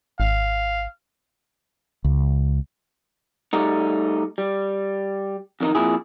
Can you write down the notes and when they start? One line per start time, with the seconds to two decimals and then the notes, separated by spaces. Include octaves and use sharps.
0.20 G#1 F5
2.04 C#2
3.53 G3 A3 D#4
4.38 G3
5.60 F2 D#3 D4 D#4
5.75 F2 A#2 E4 G#4